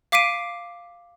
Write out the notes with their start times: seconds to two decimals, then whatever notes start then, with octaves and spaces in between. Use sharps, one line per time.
0.12 F5 D6 B6 C7 D7 D#7